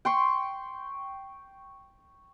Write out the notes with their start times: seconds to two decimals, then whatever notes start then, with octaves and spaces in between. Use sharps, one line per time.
0.05 G5 C6 C#6